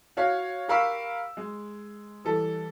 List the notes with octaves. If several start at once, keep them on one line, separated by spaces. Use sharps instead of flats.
F#4 C#5 F5
G4 A#4 F5 B5 C#6 E6
G#3
E3 G3 A4